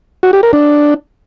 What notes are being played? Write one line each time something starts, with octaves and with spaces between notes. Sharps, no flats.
F#4
G4
A#4
D4